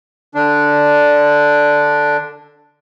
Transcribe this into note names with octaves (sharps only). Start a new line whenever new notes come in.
D3 D4